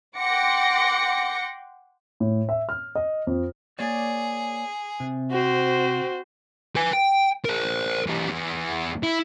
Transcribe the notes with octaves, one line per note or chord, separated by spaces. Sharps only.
F#5 G5 C6 D6 A#6 C#7
A2
E5
F6
D#5
F2
A#3 G#4 C#5 D5
C3
C4 F#4 C5
B4 G#5
G5
A#4 C5
E3 G4
E2
E4